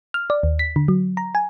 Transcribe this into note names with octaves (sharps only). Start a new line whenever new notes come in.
F6
D5
D#2
B6
D3
F#3
A#5
G#5